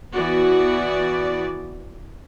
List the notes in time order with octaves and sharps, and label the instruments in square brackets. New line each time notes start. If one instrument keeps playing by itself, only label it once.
[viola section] E3 B3 F#4 D5